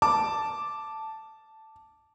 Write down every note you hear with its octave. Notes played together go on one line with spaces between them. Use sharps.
A5 D6